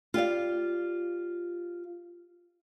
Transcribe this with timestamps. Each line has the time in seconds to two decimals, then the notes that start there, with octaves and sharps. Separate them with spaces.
0.14 F4 G4 D5 F5